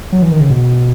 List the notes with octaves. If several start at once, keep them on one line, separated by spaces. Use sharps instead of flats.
F#3
E3
D#3
C#3
B2